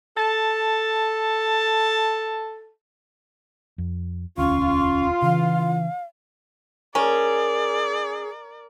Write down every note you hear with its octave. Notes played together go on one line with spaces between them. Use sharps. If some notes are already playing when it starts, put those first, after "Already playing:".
A4 A5
F2
E1 D2 C#4 F4 C#6
C#3 E3 F5
C#4 G#4 A#4 D5